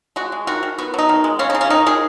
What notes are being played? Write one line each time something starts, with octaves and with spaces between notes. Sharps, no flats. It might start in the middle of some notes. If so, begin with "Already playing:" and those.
G#3 F#4
G#3
D#3 F#4
D#3
B3 F#4
F#3 D#4
D#3
G#3
C#3 C#4
D#4
C#3
C#4
D#3 D#4
D#3 G#4